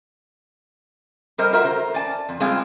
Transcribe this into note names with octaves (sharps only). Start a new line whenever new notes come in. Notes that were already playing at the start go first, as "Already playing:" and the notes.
G3 A#4 C5 D#5
F4 F#4 A#4 E5
A#4 C5
D5 G#5 A5
F2
G3 G#3 C4 F4 G#4 F5